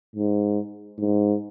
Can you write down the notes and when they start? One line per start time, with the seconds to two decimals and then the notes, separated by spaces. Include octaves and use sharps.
0.16 G#2
0.99 G#2